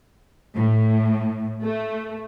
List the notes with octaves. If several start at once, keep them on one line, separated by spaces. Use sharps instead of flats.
A2
A3